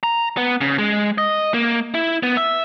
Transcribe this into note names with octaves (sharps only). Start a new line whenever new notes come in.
A#5
B3
C#3
G#3
D#5
A#3
E4
B3
E5